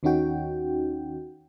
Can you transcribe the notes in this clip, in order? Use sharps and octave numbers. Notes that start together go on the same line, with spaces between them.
D#2 D#3 C#4 D#4 F#4 G5